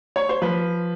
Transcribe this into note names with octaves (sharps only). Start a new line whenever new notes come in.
C#5
C5
F3 B4